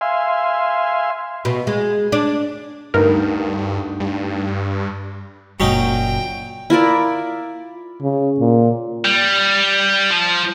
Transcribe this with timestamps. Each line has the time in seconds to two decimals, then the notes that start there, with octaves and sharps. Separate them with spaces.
0.01 E5 F5 G#5 C6
1.45 B2
1.67 G#3
2.12 D4
2.94 D2 G2 D#4 A#4 B4
4.00 G2
5.60 F#1 A#2 F#3 C#4 D#4 G5
6.70 E4 F4 A#4 D5
8.02 C#3
8.39 A#2
9.05 G3
10.11 F3